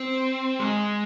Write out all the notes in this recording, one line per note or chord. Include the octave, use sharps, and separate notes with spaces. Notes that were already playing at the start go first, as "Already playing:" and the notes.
Already playing: C4
G#3